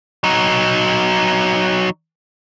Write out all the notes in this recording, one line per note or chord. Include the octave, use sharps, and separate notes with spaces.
F#3 D#4